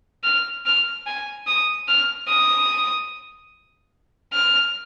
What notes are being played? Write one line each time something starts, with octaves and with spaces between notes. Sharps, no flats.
F6
F6
G#5
D#6
F6
D#6
F6